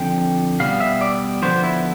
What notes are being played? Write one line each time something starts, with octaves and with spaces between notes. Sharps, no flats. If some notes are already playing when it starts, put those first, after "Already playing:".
Already playing: D3 F3 C4 G5
B2 G3 B3 F5
E5
D5
D3 F3 B3 D4 C5
E4